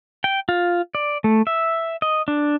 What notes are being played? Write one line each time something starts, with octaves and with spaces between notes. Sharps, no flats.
G5
F4
D5
A3
E5
D#5
D4